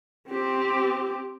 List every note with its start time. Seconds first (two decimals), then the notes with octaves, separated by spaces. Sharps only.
0.29 C4 G4